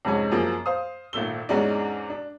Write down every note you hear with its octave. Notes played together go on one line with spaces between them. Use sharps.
F2 G#2 C3 G#3 C#4
F#2 F3 A#3 G#4
C5 F5 D#6
G#1 A#2 A3 E6 G7
E2 G#2 G#3 C#4 D4
D4